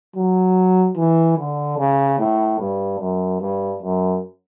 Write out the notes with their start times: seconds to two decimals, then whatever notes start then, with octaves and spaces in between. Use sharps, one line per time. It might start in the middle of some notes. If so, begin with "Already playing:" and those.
0.16 F#3
0.97 E3
1.39 D3
1.78 C#3
2.19 A2
2.60 G2
3.00 F#2
3.41 G2
3.82 F#2